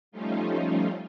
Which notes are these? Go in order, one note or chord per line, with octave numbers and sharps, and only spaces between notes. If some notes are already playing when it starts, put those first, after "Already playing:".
F3 G3 A3 C#4 D#4 F4